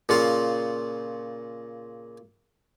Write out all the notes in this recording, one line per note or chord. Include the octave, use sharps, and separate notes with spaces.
A#2 C#3 F4